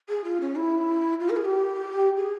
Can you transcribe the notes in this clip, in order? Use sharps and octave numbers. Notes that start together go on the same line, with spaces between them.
G#4
F4
C#4
E4
F4
A#4
G#4
G4
G#4